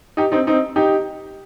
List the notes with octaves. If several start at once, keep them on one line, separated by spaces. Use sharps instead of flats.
D#4 G4
C4 D#4
C4 D#4
D#4 G4